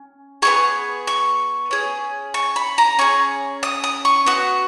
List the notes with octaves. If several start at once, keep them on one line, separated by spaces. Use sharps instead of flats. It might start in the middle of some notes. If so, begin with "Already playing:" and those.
Already playing: C#4
B3 D#4 G#4 C#6
C#6
C#4 G#4
C#6
B5
A#5
C#4 G#4 C#6
D#6
D#6
C#6
B3 F#4 C#6